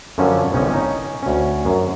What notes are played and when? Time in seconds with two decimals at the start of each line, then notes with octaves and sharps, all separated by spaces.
0.18 F#2 D3 F3 C#4 A5
0.52 G1 C2 G3 C#4 C#5 D#5
0.70 C#4 D#4
1.23 D2 C#4
1.65 F#2